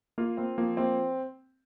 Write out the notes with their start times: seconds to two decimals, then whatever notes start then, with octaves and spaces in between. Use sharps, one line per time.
0.18 A#3 F4
0.37 A#3 C4
0.58 F3 A#3
0.77 A#3 C4